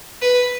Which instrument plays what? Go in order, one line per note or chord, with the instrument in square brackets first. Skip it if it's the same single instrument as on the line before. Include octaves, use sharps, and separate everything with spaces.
[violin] B4